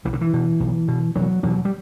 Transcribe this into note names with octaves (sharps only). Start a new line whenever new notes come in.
B1 E3
D3
E3
B2
B1
B2
E1 F#3
E2 B2 F#3
G3